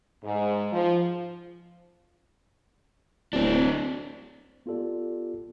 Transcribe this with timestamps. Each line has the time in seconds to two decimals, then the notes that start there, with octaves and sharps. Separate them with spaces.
0.24 G#2
0.71 F3
3.33 D1 C4 D4
4.66 B3 F4 G4 A4 D5